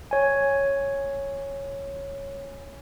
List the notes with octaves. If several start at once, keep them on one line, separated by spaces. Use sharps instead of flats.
C#5 G#5